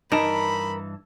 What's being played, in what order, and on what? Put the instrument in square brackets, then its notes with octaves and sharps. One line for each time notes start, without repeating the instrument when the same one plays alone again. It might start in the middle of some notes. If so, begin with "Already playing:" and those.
[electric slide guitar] G2 E3 A5 [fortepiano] D#4 [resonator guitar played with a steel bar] A#4 [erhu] B5